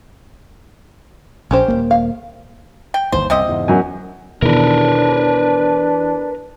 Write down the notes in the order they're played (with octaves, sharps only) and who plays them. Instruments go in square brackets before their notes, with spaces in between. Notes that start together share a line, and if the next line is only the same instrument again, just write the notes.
[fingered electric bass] A#1 [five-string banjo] C#4 G4 C5
[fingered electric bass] D#1 D#2 A#3
[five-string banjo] F5
[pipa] G5
[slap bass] G1 D#2 E3 [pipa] C5
[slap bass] C2 F#2 [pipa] C3 C4 D#5
[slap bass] E2 G#2 C#3
[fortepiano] F#2 G#5
[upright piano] E2 E4 [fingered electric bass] B2 D#3 B3 [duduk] D4 [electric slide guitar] A#4 B4